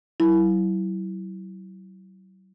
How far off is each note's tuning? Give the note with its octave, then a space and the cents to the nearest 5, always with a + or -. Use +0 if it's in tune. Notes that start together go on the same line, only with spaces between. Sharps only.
F#3 +35 E4 +0